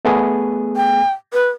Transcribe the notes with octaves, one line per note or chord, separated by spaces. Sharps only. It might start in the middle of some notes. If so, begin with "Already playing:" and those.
A3 B3 G#4
G5
B4